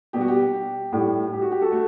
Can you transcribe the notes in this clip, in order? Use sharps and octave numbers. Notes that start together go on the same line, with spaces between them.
B2 G3 G4
F#4
G4
A2 G3
G4
F#4
G4
F#4 A4
A3